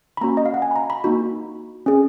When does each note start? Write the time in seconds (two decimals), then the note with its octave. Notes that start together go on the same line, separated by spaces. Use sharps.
0.17 B5
0.21 A#3 C#4 F#4 A#5
0.37 D#5
0.46 F5
0.54 F#5
0.62 G#5
0.71 B5
0.76 A#5
0.90 B5
1.04 A#3 D#4 F#4 B5
1.86 C#4 G#4